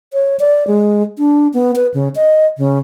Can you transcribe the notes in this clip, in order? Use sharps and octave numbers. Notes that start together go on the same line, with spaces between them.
C#5
D5
G#3
D4
B3
B4
C#3
D#5
C#3